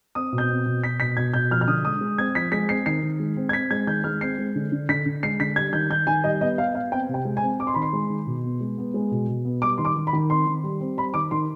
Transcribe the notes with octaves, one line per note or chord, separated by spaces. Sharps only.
C4 D#6
B2
G6
C4
B2
B2 B6
B2 B6
B2 G#6
B2 G6
F3 F6
F6
D3 D#6
G#3 D#6
G#3
C4 G#6
F3 B6
G#3 B6
C4 C7
D#3 C7
D#3
G#3
C4
G#6
C4 B6
G#3 G#6
D#3 G6
G#3 F6
C4 C7
G#3
D3
D3
D3 B6
D3
G#3 C7
D3 B6
G3 G#6
D#3 G6
D#3 G6
D#3 G#5
G3 D#5
B3 D#5
B3 F5
B3 F5
C4 G5
C3
G5
G#3
G#5
C4
C4 D6
C6
D#3 B5
C6
G#3
D#3
B2
B3
G#3
B3
G#3
B2
B2
B3
G3 D6
D#3 C6
D6
D#3
B5
D#3
C4 C6
D#3
G3
C4
G3 B5
D#3 D6
D#3 C6